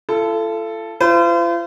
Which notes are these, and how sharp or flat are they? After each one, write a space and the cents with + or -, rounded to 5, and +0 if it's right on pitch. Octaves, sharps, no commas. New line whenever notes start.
F4 -45 A4 +0
F4 -40 C5 -40